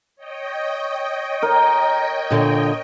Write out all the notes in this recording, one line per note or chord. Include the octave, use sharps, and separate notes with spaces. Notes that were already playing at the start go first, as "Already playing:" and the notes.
C#5 D#5 G5
A#4
A#2 D3